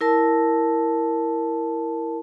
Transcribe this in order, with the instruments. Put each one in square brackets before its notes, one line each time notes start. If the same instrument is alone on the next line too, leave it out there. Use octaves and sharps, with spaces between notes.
[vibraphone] E4 A#4 A5